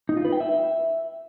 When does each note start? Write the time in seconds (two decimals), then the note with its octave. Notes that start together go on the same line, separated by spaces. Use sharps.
0.09 D#4
0.17 F4
0.25 B4
0.32 G5
0.40 E5